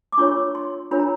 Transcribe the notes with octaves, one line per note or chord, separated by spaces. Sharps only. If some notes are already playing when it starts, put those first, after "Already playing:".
D6
D4 F4 A#4 C#5 C#6
C6
D4 F4 A#4 C#5 B5
A#5